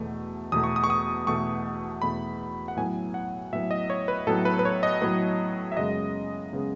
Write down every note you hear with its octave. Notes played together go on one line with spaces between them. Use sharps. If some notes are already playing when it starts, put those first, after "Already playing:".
Already playing: E2 B2 A3
E2 B2 A3 D#6
C#6
D#6
C#6
D#6
E2 B2 A3 C#6
E2 B2 A3 B5
F#5
A2 F#3 B3 G#5
F#5
A2 F#3 B3 E5
D#5
C#5
B4
A2 F#3 B3 A4
B4
B4
C#5
D#5
A2 F#3 B3 B4
E5
F#2 C#3 G#3 B3 D#5
C#3 G#3 B3